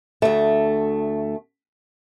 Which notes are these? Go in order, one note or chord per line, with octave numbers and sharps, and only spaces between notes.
D2 A3